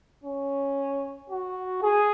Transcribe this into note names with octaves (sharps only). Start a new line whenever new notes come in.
C#4
F#4
G#4